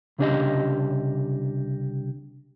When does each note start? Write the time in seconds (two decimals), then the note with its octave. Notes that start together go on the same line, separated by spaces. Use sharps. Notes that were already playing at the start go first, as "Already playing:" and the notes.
0.19 C2 C#3 D4 F4 G4 D#5